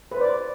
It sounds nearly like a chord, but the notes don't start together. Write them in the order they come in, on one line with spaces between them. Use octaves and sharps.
B4 C5 D5